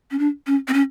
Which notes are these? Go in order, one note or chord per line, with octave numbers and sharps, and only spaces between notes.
C#4
D4
C#4
C4
C#4